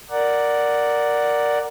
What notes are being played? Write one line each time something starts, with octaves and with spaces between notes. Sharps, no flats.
A#4 D5 F#5